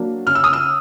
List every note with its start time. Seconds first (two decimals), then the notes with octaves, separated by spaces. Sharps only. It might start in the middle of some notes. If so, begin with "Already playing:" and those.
Already playing: F#3 A#3 D4
0.27 C#3 F6
0.35 E6
0.44 D#6
0.53 E6